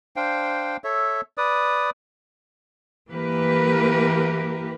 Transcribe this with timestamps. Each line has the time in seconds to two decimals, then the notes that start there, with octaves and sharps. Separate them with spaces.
0.16 D4 C5 F5 G5
0.84 A4 C#5 E5
1.38 B4 D5 D#6
3.11 E3 A#3 G4 A#4 B4